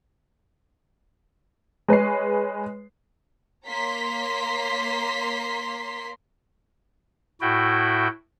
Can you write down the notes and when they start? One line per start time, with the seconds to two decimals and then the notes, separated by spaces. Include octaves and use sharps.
1.88 G#3 B4 C#5 C7
3.67 A#3 C#5 A#5 C6 B6
7.41 A2 E4 F#4 G5